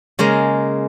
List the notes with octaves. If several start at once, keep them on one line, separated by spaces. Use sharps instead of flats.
C#3 G#3 A#3 A#4